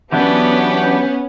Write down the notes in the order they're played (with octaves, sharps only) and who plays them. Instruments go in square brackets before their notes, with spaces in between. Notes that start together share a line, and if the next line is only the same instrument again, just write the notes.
[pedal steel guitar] E3 F#3 D4 [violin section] B3 C#4 [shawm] G4